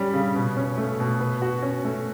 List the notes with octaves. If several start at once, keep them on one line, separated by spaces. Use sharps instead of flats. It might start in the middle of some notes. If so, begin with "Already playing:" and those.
Already playing: G3 C#4
C#3
B2
C#4
A3
B2
B4
F#4
C#4
A3